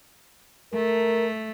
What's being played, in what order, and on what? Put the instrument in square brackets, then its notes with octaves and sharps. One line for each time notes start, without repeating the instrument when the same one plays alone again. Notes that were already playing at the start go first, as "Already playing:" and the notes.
[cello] A3 [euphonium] A#4